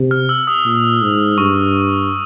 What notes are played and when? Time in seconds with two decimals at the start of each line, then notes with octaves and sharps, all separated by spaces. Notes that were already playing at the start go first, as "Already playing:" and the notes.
Already playing: C3
0.11 F6
0.29 E6
0.47 D#6
0.65 A#2
1.01 G#2
1.38 G2 C#6